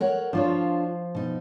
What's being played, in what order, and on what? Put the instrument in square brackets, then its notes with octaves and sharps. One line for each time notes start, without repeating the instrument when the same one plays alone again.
[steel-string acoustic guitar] A#4 C#5 F#5
[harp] F3 [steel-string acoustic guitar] D4 F4 C#5
[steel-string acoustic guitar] B2 D#4